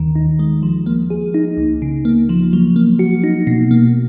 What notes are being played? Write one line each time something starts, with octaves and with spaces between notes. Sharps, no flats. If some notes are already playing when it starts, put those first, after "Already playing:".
Already playing: D#2 D#3
D#4
G#3
F3
A#3
G#4
D#4
C#2
C#3
A#3
F3
F#3
A#3
F#4
D#4
B2
A#3